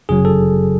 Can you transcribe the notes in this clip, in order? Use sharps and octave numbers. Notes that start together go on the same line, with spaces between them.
G1 F#2 C#3 F#3 G#4
A4